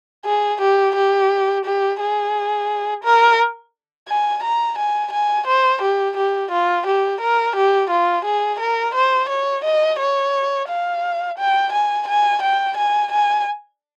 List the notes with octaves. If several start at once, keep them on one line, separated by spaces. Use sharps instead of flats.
G#4
G4
G4
G4
G#4
A#4
G#5
A#5
G#5
G#5
C5
G4
G4
F4
G4
A#4
G4
F4
G#4
A#4
C5
C#5
D#5
C#5
F5
G5
G#5
G#5
G5
G#5
G#5